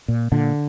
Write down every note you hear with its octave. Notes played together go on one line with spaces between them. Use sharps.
A#2
A#2 D3